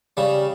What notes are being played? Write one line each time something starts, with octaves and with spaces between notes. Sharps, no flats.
C#3 G3